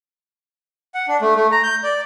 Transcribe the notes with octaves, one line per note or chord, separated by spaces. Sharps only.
F#5
D4
A3
A3
A#5
G6
D5